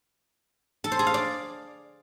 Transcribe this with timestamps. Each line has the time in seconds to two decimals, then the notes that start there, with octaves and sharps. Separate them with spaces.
0.84 A4
0.92 C5
0.99 G#4
1.07 F5
1.14 D5